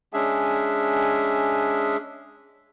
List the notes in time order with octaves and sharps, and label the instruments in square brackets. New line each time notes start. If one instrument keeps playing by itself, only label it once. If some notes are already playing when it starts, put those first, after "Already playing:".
[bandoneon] G#3 C#4 D4 G#4 E5